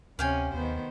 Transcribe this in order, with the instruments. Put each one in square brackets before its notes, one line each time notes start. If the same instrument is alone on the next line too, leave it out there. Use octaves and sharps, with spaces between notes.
[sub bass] D2 [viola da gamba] C3 C#4 [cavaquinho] F5 G5 G#5
[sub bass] D#2 [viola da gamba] D#3 B3 C5